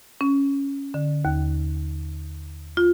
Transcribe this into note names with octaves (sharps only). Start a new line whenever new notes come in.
C#4
D3
D#2
F4